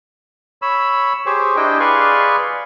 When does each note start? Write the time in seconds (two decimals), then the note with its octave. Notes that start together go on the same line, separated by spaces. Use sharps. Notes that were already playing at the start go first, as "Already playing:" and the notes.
0.62 C#5 B5 E6
1.26 G4 G#4 C5 C#5
1.56 D4 E4 G4 D#5 G5
1.80 G#4 B4 D5 F5 C6 C#6